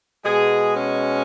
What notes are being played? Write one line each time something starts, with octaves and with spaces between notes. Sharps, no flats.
B2 G#3 G#4
C#4